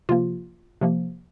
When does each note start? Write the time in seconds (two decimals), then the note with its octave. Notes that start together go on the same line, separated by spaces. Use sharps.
0.09 C3 F3 A#3 F4
0.81 C3 F3 A#3